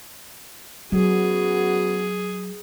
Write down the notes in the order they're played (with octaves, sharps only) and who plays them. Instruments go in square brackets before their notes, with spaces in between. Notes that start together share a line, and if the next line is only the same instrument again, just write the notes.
[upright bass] F#3 [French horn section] B3 C#4 F#4 [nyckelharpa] G#4